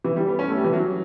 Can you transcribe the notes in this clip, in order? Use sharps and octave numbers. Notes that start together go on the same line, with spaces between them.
E3
G3
B3
C#4
A3
G3
E3
F#3